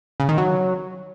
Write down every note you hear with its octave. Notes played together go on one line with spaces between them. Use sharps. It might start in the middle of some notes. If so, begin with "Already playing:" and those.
C#3
D#3
F#3